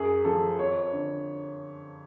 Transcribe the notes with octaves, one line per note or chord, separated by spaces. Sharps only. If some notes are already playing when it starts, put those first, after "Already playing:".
Already playing: F#2 G#4
F3 A4
F2 C#5
D3